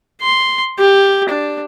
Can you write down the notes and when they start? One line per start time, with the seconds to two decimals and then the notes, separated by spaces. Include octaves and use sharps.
0.22 C6
0.79 G4
1.29 D4